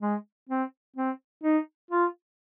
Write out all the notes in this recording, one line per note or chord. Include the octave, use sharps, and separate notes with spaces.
G#3
C4
C4
D#4
F4